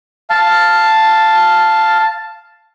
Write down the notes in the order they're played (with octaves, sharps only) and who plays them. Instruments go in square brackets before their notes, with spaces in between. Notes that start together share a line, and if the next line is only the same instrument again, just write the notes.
[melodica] F5 A5